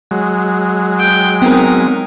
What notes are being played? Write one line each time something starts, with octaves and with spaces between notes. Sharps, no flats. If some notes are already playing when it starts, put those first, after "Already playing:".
F#3 G#3
G5
B3 C4 D#4 A#4 G5